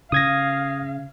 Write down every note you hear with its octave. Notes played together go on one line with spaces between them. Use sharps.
C#3 F5 D#6 G#6 A#6